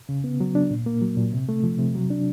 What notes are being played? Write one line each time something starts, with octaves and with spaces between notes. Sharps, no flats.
C#3
B3
F#3
D4
A#2
A#3
F#3
A#2
C3
A3
F3
C3
F#3
D4